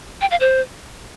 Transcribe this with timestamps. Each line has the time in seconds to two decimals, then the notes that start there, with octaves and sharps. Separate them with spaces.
0.21 G5
0.31 F5
0.40 C5